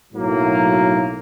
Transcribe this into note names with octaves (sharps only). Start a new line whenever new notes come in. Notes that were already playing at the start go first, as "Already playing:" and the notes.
B1 A2 F#3 A#3